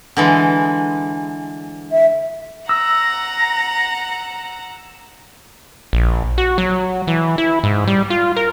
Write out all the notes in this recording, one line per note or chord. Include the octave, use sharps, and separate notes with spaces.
D3 E3 G#3
E5
F#5 A#5 E6 A#6
A#1
F#4
F#3
E3
E4
G#2
G3
F4
A#4